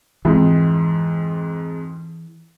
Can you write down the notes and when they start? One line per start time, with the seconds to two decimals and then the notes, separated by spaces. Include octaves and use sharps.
0.25 F2 G#2 E3